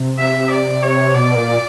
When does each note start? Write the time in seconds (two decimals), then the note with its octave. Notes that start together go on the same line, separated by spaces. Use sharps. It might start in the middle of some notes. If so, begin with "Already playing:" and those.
Already playing: C3
0.19 E5
0.50 D5
0.83 C#5
1.14 B2 D5
1.36 A#2